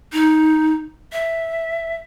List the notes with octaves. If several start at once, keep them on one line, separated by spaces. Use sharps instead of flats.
D#4
E5